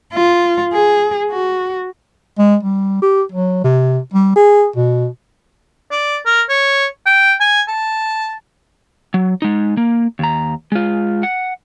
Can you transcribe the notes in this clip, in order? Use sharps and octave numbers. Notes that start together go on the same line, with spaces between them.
F4
G#4
F#4
G#3
G3
G4
F#3
C3
G3
G#4
B2
D5
A#4
C#5
G5
G#5
A5
F#3
G#3 D#4
A#3
D#2 A#5
G#3 F4
F#5